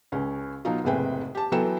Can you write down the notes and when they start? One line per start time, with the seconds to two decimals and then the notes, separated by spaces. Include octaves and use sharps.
0.12 C#2 C#4
0.65 B2 F#3 D#4 F4
0.84 F#1 A2 C3 G#4 B4 G5
1.35 G4 A5
1.52 E3 F#3 B3 A4 G5 E7